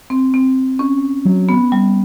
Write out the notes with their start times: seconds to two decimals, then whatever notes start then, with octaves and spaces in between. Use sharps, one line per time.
0.10 C4
0.34 C4
0.79 C#4
1.25 F#3
1.49 B3
1.72 G3